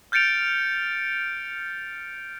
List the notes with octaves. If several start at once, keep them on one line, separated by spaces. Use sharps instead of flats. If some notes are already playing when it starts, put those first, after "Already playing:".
F6 G6 A6 C#7 D7 F7